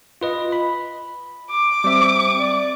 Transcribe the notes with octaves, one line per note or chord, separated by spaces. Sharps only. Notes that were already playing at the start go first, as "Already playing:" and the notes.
F4 B4 D#5
B5
D6
G3 C4 E5
D5